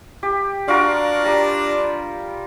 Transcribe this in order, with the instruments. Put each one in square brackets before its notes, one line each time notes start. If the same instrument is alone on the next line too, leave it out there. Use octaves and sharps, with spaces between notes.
[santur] G4
[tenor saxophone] D4 [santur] F4 F#4 A#4
[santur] G3 A#5